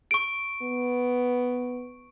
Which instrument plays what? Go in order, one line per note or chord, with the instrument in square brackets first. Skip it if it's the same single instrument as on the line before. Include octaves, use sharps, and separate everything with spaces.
[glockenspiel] C#6 D7
[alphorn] B3